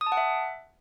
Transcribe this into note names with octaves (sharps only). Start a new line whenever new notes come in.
D#6
A5
F#5
E5